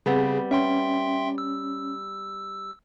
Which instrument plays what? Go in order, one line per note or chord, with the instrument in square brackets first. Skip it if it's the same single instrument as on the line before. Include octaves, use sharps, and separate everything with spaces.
[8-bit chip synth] C#3 [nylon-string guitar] G3 B3 C4 [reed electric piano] G#4
[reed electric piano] C#4 [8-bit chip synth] E5 G5 C6
[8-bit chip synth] E6